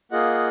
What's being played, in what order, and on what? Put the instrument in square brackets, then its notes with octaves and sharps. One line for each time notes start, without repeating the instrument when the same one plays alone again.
[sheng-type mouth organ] A#3 F4 G#4 D#5 F#5